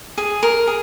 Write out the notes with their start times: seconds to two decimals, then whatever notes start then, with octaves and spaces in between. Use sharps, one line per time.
0.18 G#4
0.43 A#4
0.67 G#4